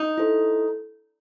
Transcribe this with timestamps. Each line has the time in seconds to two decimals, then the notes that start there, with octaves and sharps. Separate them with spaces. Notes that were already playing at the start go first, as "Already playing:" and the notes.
Already playing: D#4
0.18 E4 A4 C5